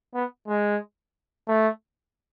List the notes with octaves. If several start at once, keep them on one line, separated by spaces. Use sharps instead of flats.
B3
G#3
A3